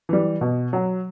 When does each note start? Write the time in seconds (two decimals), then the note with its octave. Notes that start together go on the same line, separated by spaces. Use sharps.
0.09 E3 G3
0.41 B2
0.73 F#3